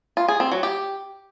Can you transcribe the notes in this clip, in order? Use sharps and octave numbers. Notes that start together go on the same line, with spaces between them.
F4
G#4
C4
F#3
G4